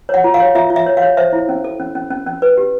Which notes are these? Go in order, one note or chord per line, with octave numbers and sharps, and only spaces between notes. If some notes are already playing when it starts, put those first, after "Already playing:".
C#5 F#5
F4
F5
C#5
F4 E5
F4
E5
C#5
F5
C#5
C5 E5
E4
C#4
A4
C#4
C#4
C#4
C#4
B4
G4